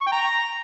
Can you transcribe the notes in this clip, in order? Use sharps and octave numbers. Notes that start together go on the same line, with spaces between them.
C#6
G5
A#5